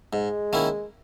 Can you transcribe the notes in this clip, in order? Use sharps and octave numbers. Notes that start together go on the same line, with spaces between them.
G#2 G#3
D#3 A#3 C#4 E4